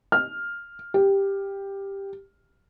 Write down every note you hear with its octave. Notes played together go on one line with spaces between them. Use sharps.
F6
G4